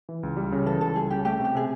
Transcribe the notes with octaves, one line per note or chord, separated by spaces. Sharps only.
E3
C#2
G3
C#3
E3 A4
C#2 A4
G3 G#4
C#3 G4
A3 G4
C3 G4
C3 G#4